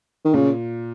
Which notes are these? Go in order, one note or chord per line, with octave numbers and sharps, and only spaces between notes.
D#3
A#2 C#3